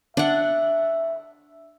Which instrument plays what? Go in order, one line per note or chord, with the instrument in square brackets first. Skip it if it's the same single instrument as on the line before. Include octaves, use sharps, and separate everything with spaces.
[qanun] D4 F#5 [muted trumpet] E5